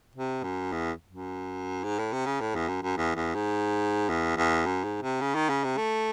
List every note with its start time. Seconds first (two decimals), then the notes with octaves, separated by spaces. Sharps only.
0.16 C3
0.43 F#2
0.72 E2
1.10 F#2
1.84 G#2
1.99 A2
2.13 C3
2.26 C#3
2.41 A2
2.55 E2
2.69 F#2
2.83 F#2
2.97 E2
3.16 E2
3.35 G#2
4.09 E2
4.37 E2
4.66 F#2
4.84 G#2
5.02 C3
5.21 C#3
5.35 D#3
5.50 C#3
5.64 C3
5.77 A3